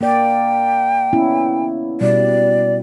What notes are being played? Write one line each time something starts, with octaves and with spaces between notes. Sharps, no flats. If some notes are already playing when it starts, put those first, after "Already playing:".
A#3 D5 G5
B3 C#4 E4
B2 G3 D5